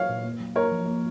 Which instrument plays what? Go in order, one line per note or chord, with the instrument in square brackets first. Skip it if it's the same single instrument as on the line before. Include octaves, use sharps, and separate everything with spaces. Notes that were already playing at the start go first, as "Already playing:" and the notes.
Already playing: [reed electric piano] F#3 [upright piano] C#5 F5
[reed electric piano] A#2
A#3
F#3
[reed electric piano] A#3 [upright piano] A#4 C#5
[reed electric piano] F3
A#3